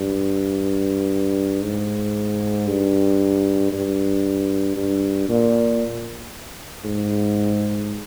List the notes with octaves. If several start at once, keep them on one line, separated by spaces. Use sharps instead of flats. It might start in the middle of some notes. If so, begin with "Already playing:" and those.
Already playing: G2
G#2
G2
G2
G2
A#2
G#2